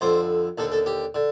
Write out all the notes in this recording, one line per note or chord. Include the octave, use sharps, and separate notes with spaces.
F2 D3 C5
D#2 D3 A4
A4
G4
D3